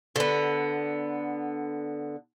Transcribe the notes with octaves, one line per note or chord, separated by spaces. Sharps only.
D3 B3